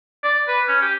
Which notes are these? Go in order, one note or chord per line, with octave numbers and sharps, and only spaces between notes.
D5
B4
C#4
G4